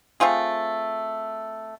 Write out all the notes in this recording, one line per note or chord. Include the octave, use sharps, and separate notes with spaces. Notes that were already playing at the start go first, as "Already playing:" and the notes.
A3 C4 F4 G#4